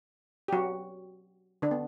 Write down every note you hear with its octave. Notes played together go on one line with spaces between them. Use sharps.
G4
F#3 F#4
D3 D4
B3